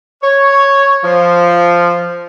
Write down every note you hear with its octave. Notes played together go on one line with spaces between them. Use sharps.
C#5
F3